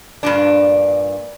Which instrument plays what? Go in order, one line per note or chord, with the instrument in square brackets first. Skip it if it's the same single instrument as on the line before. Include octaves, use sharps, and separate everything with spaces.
[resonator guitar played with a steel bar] G2 A#2 D4